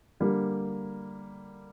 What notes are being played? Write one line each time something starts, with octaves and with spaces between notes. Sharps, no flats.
D3 G3 A#3